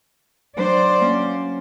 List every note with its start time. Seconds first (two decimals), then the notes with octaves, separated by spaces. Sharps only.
0.57 F#3 D4 C5 D5
1.01 A#3 C#4